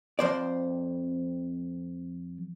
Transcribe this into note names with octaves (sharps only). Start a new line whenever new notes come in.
F2 C5 D5